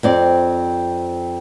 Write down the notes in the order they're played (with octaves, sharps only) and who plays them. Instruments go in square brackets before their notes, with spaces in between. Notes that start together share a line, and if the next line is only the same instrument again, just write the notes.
[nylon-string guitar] F2 C4 D5